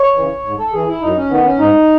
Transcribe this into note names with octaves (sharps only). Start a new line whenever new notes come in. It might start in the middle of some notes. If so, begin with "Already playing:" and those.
Already playing: C#5
C#3 E3
G#2
A4
E3 G#4
E4
F#2 D#4
C#4
D#3 B3
C#4
G#2 D#4